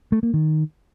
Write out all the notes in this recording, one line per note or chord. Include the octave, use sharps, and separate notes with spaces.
A3
A#3
D#3